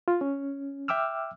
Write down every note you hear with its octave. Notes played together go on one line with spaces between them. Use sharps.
F4
C#4
E5 G5 D6 E6 F6